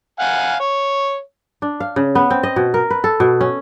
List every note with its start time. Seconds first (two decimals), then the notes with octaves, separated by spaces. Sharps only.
0.20 F5 F#5 G#5
0.60 C#5
1.62 D4
1.80 F5
1.96 C#3
2.15 B3
2.30 C4
2.43 D#5
2.56 B2
2.74 A#4
2.90 B4
3.04 A4
3.20 B2
3.41 C#4